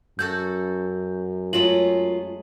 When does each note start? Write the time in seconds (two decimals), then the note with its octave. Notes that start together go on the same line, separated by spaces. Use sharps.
0.19 F#2 F#4 A4 F#5 G6
1.53 F#3 G#3 A3 F4 F#7